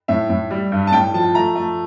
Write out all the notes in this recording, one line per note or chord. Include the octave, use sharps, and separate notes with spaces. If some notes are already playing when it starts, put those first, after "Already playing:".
A2 E5
A2
G3
G2
A5
A2 G5
F3 A5
A3 A#5
A3